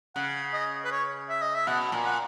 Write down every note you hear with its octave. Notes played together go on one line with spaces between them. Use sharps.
C#3 F#5
D#5
B4
C#5
E5
D#5
E5
B2 F#5
A#2
F#5